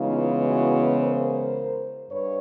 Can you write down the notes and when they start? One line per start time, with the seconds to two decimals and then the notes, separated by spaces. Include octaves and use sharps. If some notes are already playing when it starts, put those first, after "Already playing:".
Already playing: C#3 E3 G#3 B3 D#4 F4
0.44 E4 F#4
0.99 A#4 C5
2.10 G2 B4 C#5